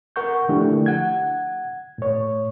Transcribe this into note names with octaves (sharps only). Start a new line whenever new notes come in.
A#4 F#5 C#6 G6
D3 F3 A3 D4 E4 G4
F#5 G#6
A2 C#5